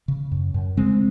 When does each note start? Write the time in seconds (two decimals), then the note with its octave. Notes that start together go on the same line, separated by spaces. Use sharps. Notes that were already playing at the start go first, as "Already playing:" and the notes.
0.08 C#3
0.31 F#2
0.54 F#2
0.77 C#3 G#3 C4